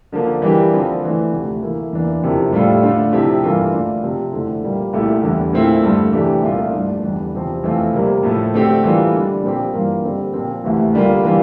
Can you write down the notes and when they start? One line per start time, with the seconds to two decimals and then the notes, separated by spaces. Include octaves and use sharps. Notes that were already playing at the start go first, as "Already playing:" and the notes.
0.12 D3 F3 A#3
0.42 E3 G3 A#3 D4 G4
0.72 D3 F3 C4 F4
1.03 E3 A3 D4
1.33 D2 C3 F3
1.63 E3 A#3 E4 A4
1.93 E2 E3 A#3 D4
2.22 F2 C3 F3 A#3 E4
2.53 A2 G3 D4 F4 A4
2.83 D3 A3 D4 F4
3.13 C3 F3 C4 E4 G4
3.42 G2 E3 A#3 F4 A4
3.73 D3 A3 D4 F4
4.03 C3 F3 C4
4.32 F2 D3 A3 E4
4.63 A#2 G3 A#3
4.93 C2 A#2 A3 E4 G4
5.23 E2 D3 G3 D4
5.53 A#2 A3 C4 E4
5.83 G2 D3 A3
6.13 C3 E3 A3 D4 G4
6.43 C2 A#2 A3 D4 F4
6.73 G2 F3 A3 D4
7.03 E2 D3 G3 D4
7.33 E2 C3 F3 C4
7.63 F2 E3 A3 C4 F4
7.93 C3 G3 A#3
8.23 A2 F3 A3
8.54 D3 A3 C4 G4
8.84 E3 G3 A#3 F4 A4
9.14 D3 G3 D4
9.43 A#2 F3 C4 G4
9.73 G2 E3 G3 A#3 F4
10.04 D3 G3 C4
10.34 A#2 F3 C4
10.64 D2 C3 E3
10.94 D3 G3 A#3 F4
11.24 E3 G3 A#3 F4